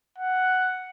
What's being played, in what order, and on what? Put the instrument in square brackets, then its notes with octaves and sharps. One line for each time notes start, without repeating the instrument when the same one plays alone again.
[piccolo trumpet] F#5